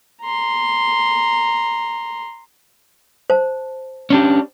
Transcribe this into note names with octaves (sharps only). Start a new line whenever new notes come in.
A#5 C6
C5 A5
C#4 D4 G4